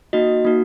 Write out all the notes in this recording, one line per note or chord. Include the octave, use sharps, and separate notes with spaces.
A#3 D#4 F#4 D#5
A#3 D#4 F#4